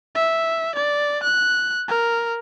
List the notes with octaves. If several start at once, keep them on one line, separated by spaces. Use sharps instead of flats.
E5
D5
F#6
A#4